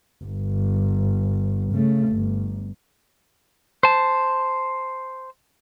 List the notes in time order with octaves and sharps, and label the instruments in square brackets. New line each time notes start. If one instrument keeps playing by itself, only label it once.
[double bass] G1
C#3 A3
G1
[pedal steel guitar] C5 A5